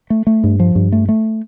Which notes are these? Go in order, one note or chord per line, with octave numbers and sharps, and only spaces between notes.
A3
A3
G2
F3
G2
A3
A3